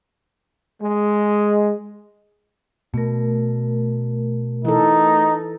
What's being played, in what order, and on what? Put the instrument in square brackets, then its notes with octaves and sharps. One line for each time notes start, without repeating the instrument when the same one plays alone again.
[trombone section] G#3
[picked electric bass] B2 [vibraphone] A3 A#4
[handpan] E3 A4 [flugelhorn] D#4